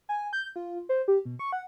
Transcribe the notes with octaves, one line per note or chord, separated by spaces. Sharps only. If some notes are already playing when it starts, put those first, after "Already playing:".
G#5
G6
F4
C5
G4
B2
C#6
F#5